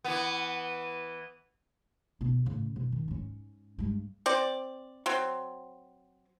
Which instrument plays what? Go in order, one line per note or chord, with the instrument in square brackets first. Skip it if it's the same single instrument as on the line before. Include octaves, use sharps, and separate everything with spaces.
[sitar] E3 B3
[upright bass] B2 B3
A2 C#3
B2
D#3
G#2 C#4
G2 G#3
[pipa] C4 D5
F#3 C4